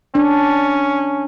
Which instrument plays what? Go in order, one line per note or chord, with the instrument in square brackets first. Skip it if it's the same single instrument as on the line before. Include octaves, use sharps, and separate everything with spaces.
[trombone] C#4 [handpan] D4